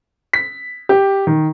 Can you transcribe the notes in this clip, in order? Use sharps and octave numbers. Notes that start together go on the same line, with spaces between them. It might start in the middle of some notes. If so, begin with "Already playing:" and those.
B6
G4
D#3